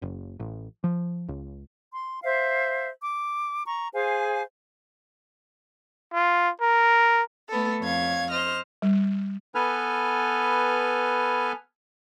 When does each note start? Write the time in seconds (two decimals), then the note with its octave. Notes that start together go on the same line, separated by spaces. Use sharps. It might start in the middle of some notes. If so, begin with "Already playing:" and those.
0.02 F#1
0.40 A1
0.84 F3
1.29 C#2
1.91 C6
2.23 C5 E5 F5
3.01 D6
3.66 A#5 C#6
3.93 G#4 C5 F5 G#5
6.13 F4
6.61 A#4
7.49 A3 B3 A4
7.81 F2 C#5 F5 G#6
8.30 C5 D#5 F6
8.82 G3
9.55 B3 A4 B4 G#5 F6